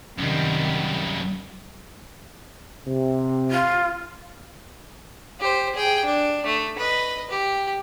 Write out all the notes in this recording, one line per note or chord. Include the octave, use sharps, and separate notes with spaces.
F#2 C3 D#3 G3
C3
F4
G4 C5
G#4 G5
D4
A3
B4 D#5
G4